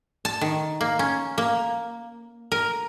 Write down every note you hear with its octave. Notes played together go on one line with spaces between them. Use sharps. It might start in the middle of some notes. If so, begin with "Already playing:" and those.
A5
D#3
A#3
C#4
A#3
A#4